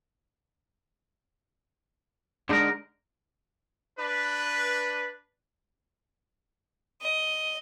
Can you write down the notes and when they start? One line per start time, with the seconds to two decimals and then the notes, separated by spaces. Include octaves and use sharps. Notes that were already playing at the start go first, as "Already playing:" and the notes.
2.49 D3 G#3 D4 D#4 A#4
3.99 D4 B4
7.02 D#5